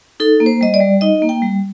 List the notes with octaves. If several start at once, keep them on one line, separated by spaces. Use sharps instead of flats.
D#4 A4
A#3
C5
G3 D#5
D5
G3
D#4 D#5
A#3
G5
G3